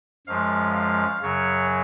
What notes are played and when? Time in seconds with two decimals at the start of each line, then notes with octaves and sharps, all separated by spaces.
0.27 F#2 F3 G#3 F5
0.75 F5
1.22 F#2 C#3 F#3 C#5